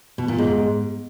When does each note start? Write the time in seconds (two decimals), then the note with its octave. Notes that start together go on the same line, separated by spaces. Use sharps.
0.18 B2
0.28 A#2
0.38 G#2